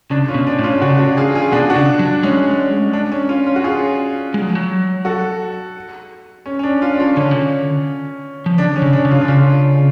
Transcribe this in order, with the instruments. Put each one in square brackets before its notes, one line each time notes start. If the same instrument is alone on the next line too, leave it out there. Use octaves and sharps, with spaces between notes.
[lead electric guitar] C#3 [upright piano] D4
[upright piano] C#4 F4
[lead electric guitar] B2
[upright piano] D4
[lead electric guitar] A2
[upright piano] C#4 F4
[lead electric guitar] C#3 [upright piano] D4 F#4
[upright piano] D4 F#4
F4 G#4
F4 G#4
[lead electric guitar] B2 [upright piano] D4 F#4
[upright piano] D4 F#4
[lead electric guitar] C#3
F#3
[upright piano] D4
[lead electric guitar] G#3 [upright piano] C#4
[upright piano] D4
C#4
C#4 F4
C#4 F4
F#4
F4 G#4
[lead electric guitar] G#3
F#3
F3
F#3
[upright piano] F#4 A4
C#4
C#4
D4
C#4 F4
D4
C#4 F4
[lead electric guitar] D3 [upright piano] C#4
[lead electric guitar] C#3
D3
F3
[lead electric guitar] D3 [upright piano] D4
[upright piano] C#4
[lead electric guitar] C#3
[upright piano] D4
[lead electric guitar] C#3
[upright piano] C#4 F4
D4
[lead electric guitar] C#3 [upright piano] C#4 F4